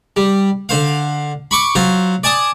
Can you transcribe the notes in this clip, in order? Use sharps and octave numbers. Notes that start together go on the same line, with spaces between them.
G3
D3 C5 F5
B5 C#6 D6
F#3 F4 C5
D5 G#5 A5 D#6